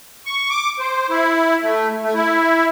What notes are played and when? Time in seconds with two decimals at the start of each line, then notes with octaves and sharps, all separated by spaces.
0.26 C#6
0.50 D6
0.79 C5
1.10 E4
1.62 A3
2.02 A3
2.15 E4